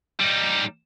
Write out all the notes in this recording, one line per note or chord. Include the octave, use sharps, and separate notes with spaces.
G3 D#4